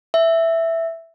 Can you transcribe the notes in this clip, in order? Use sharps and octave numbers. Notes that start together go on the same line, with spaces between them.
E5